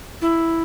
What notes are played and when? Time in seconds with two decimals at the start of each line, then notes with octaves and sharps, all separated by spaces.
0.22 E4